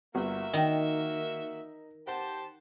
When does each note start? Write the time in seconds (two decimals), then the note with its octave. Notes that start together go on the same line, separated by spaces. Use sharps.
0.15 G1 A#3 F#4 E5
0.53 D#3 D#4
2.07 G4 C5 F#5 A5